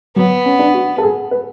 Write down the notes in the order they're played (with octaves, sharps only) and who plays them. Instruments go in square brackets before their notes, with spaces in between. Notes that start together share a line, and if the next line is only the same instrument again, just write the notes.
[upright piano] F#3 [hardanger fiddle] B3
[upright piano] C#4
D4
F#4
A4
G#4
B4